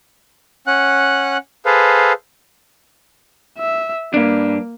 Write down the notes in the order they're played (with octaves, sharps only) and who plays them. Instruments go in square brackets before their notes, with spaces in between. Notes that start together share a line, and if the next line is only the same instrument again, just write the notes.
[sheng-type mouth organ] C#4 F#5 F#6
G#4 A4 B4 C5 F5
[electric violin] E5
[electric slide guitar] G2 D4 [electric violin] A#3